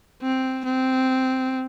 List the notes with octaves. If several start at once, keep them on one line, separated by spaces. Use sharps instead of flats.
C4
C4